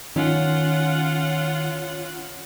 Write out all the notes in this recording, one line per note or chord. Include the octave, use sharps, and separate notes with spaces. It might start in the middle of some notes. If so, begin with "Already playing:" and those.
D#3 C#4 F4 F#5